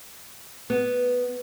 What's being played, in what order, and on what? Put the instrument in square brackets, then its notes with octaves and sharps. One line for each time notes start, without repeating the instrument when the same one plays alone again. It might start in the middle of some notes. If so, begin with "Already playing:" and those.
[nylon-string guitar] B3